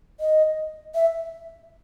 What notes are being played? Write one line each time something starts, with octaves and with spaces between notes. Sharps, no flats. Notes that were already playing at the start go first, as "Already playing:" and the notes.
D#5
E5